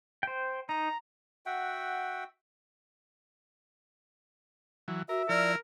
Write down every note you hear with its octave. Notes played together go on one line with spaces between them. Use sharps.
C5 G5
D#4 A#5
F#4 E5 F#5 G5
E3 F#3
F#4 A#4 E5
F3 E4 A#4 D5